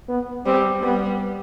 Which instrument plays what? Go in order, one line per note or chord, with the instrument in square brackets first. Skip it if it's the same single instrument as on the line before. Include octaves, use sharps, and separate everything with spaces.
[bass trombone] B3
[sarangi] G3 [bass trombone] C4
[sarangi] G3 [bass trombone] B3